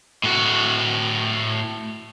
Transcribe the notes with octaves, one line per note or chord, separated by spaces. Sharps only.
A2 F#4